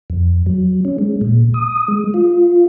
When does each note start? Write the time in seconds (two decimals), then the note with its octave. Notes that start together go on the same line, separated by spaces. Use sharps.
0.10 F2
0.46 F#3
0.85 C#4
0.98 G#3
1.21 A#2
1.54 D#6
1.88 G#3
2.14 F4